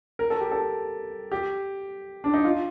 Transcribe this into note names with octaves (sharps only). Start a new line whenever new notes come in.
A#4
A4
G4
A4
G4
D4
D#4
F4